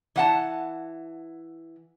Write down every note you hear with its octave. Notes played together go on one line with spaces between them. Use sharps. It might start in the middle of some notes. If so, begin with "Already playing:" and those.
E3 F#5 A5